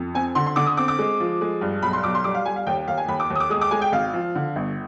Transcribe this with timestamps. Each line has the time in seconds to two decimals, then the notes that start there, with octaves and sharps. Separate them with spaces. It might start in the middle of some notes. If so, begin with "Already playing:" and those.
Already playing: F2
0.14 C4 G#5
0.35 D3 C6
0.46 C6
0.56 D3 D6
0.66 D#6
0.77 C4 D6
0.88 D6
0.99 G#3
1.20 F3
1.41 G#3
1.61 G2
1.82 B1 B5
1.93 C6
2.04 B1 D6
2.15 C6
2.24 G3 D6
2.34 F5
2.46 G3 G#5
2.56 F5
2.67 D#2 G5
2.88 D#2 F5
2.97 G#5
3.08 D#2 B5
3.20 D6
3.30 D#2
3.36 D#6
3.40 D6
3.50 G#3 D#6
3.61 D6
3.71 G#3 G#5
3.82 G5
3.92 G#1 F5
4.13 F3
4.35 D3
4.56 G1